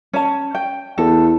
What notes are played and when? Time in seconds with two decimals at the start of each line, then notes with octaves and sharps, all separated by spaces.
0.13 C#4 A5
0.55 G5
0.98 E2 A4